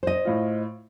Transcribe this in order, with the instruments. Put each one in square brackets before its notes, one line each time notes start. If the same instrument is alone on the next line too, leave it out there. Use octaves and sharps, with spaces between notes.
[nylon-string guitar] C5 D#5
[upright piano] A2 F4